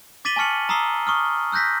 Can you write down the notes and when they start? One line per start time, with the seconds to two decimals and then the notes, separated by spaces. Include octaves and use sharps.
0.25 D6 A6 B6 D#7 F#7 G7
0.36 G#5 A5 C#6 F6 C#7 F#7
0.69 A#5 D#6 E6 C7 G7
1.07 C#6 D#6 F6
1.52 E6 F#6 G6 A#6 B6